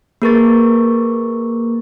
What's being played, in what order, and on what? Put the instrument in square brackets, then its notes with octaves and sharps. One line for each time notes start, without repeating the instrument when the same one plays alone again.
[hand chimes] A#3 G#4 A#4 B4 C#6 A6